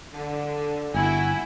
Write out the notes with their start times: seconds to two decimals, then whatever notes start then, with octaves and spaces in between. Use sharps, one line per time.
0.12 D3
0.94 G1 E4 F#4 G5 G#5